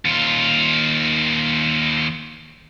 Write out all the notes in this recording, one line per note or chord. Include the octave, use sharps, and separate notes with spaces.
D#2 F4